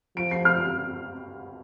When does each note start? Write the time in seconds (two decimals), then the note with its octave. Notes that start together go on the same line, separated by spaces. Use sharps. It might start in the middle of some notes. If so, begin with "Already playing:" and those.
0.16 F3 D7
0.31 C7
0.45 F6